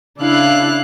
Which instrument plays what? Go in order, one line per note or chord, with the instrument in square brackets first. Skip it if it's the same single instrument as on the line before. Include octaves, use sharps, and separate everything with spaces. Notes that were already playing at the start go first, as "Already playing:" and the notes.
[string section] C#3 D4 E4 F5 F#6